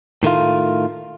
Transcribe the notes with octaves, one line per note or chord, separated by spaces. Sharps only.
A2 D#3 A3 F4